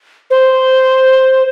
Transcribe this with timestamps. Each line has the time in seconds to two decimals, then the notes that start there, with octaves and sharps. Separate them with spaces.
0.30 C5